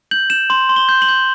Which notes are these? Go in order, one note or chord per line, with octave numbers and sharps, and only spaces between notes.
G6 F#7
G6 E7
C6 F#7
C6
G7
G6
F#7
G6